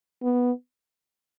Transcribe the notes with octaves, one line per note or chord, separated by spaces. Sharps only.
B3